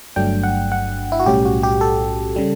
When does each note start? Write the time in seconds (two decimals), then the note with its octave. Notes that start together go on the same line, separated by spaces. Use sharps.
0.16 G1 G2 F#3 A3 D4 G5
0.43 F#5
0.72 F#5
1.12 E4
1.20 F#4
1.26 B1 A2 G3 C#4 G4
1.45 F#4
1.63 G4
1.81 A4
2.36 C#3 G3